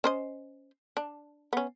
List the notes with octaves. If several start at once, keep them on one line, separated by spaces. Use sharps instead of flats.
C#4 C5 D#5
D4
B3 C#4